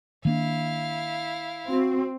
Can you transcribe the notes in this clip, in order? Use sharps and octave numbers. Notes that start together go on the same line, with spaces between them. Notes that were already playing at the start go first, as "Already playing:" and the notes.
D#3 A#3 D4 E4 F5
C4 F#4